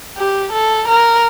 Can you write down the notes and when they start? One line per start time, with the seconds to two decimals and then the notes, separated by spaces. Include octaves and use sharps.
0.17 G4
0.52 A4
0.88 A#4